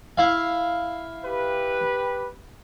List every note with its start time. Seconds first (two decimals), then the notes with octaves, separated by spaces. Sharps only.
0.18 E4 F5
1.25 G4 B4